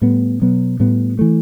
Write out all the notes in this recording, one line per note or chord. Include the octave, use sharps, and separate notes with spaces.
A2 G3 B3
B2 F#3 B3
A2 G3 B3
E3 A3